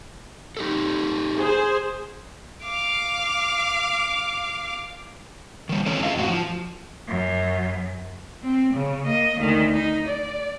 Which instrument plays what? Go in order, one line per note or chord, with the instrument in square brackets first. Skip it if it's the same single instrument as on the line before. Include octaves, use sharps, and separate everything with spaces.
[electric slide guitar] D#4 G4 A4
[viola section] G#4 C5
[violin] F5 D6
[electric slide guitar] D#3 G3
G#3 C4 C#4 A4 C#5
C#4 G4 G#4 D#5 F5
F2 A2 F#4
F3
[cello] F#2
C4
C#3
A#3 D#5
D2 D#3
D#4
D5